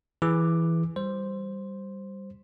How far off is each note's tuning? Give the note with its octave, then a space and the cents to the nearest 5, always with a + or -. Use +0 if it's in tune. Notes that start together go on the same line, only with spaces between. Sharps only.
E3 +0 G#4 +0 D6 +5
G3 +0 C5 +0